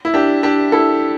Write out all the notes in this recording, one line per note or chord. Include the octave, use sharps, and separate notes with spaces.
E4
D4 G4
D4 G4
E4 A4